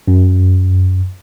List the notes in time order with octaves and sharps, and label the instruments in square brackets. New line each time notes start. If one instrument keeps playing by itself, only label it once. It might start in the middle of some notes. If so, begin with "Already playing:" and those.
[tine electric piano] F#2